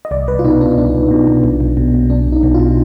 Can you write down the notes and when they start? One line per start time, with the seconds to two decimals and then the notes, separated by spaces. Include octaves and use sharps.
0.05 D#5
0.11 C2 D5
0.27 C2 B4
0.39 F4
0.44 B2 D#4
0.61 B2 D4
0.78 C2 D4
0.94 C2
1.11 B2
1.27 B2
1.44 B1
1.60 B1
1.77 B2
1.94 B2
2.10 B1 D4
2.27 B1
2.32 D#4
2.43 B2
2.54 F4
2.60 B2